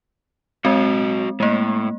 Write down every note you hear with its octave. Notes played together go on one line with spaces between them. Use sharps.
F#3 G#3 C4 F#4 D#5
A2 G#3 A#3